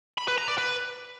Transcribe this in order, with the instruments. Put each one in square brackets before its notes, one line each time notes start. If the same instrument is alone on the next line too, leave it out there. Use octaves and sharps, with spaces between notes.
[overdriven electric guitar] B5
B4
A#5
D5
B4